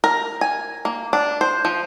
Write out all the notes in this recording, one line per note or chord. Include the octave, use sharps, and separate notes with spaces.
A#4
G#5
A#3
D4
C5
F3